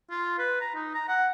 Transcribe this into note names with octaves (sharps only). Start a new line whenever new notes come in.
F4
B4
A#5
D#4
A#5
F#5